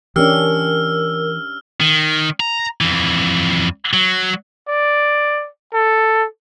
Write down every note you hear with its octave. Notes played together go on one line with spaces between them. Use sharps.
E3 C#4 D4 G4 A#4 E6 F6
D#3
A#5
F2 E3
F#3
D5
A4